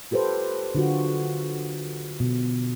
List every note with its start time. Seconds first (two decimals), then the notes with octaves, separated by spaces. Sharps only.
0.11 F4 G4 A4 B4 C5
0.75 D3 F4 F#4
2.20 B2